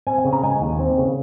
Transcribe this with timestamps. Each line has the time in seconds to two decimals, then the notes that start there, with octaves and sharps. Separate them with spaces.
0.07 C4 G#5
0.25 C#3
0.33 A#5
0.43 G#3 G#5
0.61 D#2
0.79 C4
0.98 C#3